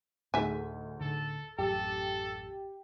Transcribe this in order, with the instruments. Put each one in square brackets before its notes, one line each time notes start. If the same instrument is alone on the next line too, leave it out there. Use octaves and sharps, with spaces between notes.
[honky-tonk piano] D2 D#4 G#4 [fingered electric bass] A2 [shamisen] E5 G#5
[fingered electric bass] A2 D3 [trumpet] A4
[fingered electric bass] A1 F#2 [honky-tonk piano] G4 [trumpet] A4